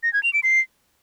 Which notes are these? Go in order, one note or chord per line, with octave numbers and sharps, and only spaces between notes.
A#6
G#6
F7
D7
C7